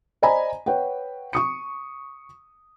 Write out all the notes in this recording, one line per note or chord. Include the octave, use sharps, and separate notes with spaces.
C5 D5 D#5 G#5 A#5 B5
B4 C#5 F#5 G5
C#6 D#6 C#7